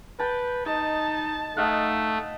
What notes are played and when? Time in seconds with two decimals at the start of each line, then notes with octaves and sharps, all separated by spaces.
0.19 B4 G5 A5
0.66 D#4 D#5 A5
1.57 A3 D#4 D#5 F5 F#5